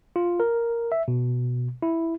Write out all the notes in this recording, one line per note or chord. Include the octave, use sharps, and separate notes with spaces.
F4
A#4
E5
B2
E4